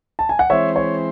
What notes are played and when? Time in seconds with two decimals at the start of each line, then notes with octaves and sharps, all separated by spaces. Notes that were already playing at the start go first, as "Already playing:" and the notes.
0.19 A5
0.29 G#5
0.39 F#5
0.50 E3 G#3 C4 E4 C5 C#5 E5
0.76 C#5